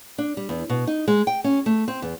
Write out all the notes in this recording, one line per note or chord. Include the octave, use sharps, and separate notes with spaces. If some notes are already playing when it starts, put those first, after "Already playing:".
D4
G3
E2
B2
D#4
G#3
G5
C#4
A3
C4
E2